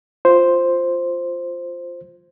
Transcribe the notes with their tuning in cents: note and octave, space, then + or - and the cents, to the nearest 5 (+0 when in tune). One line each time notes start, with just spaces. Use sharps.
F4 +0 C5 +0